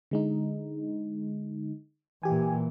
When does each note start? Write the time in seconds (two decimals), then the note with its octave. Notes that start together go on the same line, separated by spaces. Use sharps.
0.11 D3 G#3 D#4
2.23 A#2 E3 G4 G#5